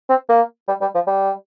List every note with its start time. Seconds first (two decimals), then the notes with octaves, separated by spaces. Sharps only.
0.09 C4
0.29 A#3
0.68 G3
0.81 G3
0.95 F3
1.07 G3